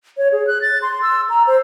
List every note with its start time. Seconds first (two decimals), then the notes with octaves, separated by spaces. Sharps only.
0.18 C#5
0.32 G#4
0.47 F#6
0.62 A6
0.82 C6
1.02 E6
1.30 A#5
1.47 C5